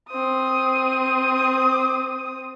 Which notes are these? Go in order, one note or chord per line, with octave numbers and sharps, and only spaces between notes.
C4 D#6